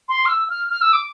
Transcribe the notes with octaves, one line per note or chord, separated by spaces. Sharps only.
C6
F6
E6
F6
F6
E6
D6